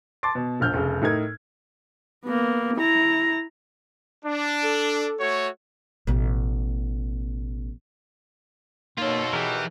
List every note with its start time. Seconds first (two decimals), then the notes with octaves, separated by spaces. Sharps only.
0.23 A5 C6 D6 A6
0.35 B2
0.60 E1 A#1 F6 G6
0.74 F1 C#3
1.01 A2 D#4 A#4 G#6
2.25 A#3 B3
2.76 E4 A#5
4.25 D4
4.64 A4
5.20 A3 F#4 C#5
6.07 A1 B2
8.98 B2 A#3 D#4 F4 A4 C#5
9.33 E3 G4 G#4 A#4